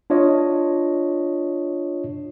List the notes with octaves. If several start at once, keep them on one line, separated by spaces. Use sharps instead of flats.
D4 F4 C#5 D#5